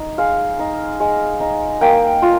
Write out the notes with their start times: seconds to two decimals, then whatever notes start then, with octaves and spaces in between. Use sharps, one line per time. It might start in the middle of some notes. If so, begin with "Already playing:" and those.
Already playing: D#4
0.18 G#3 F5
0.59 D#4
1.00 G#3
1.40 D#4
1.81 A#3 G5
2.22 F4